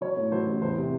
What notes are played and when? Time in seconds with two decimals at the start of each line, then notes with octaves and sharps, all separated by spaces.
0.01 F#3 C#5
0.17 A2
0.31 F#3 C5
0.47 A1
0.62 E2 C5
0.76 C3